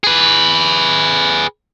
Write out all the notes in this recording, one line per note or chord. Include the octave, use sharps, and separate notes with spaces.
G#4 B4